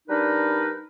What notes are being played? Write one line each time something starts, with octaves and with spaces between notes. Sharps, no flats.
G3 D4 D#4 A#4 B4